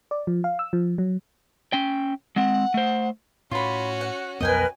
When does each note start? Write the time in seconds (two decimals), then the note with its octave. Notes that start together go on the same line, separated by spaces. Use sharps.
0.11 D5
0.27 F3
0.44 F5
0.59 E6
0.73 F3
0.98 F#3
1.73 C#4 G5
2.36 G#3 C4 F#5
2.74 A3 C5
3.51 A2 C#4 F4 F#4 B5
4.01 F#5
4.41 B1 F2 B3 A#4 B4 D#5 G5 G#5